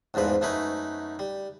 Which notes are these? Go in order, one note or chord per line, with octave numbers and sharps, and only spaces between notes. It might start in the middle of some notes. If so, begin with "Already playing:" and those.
A1 E2 G#2 F3 B4
F#2 A3 C#4 D#4 B4
G3